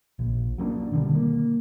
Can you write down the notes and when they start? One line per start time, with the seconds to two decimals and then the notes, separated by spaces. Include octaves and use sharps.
0.19 A#1
0.58 F#3 A#3 C4 D4
0.92 B2 D3 D#3 G3
1.15 A#3